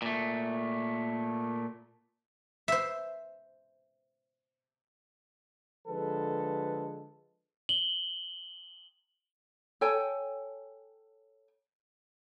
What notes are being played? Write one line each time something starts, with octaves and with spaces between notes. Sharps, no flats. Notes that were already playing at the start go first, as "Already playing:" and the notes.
A#2 A3
C5 E5
D3 F3 G#3 A4 B4
F#7 G7
A4 C#5 G5 G#5